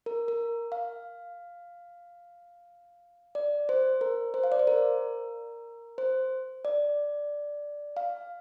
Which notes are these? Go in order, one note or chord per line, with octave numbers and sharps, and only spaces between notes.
A#4
A#4
F5
D5
C5
A#4
C5
F5
D5
C5
A#4
C5
D5
F5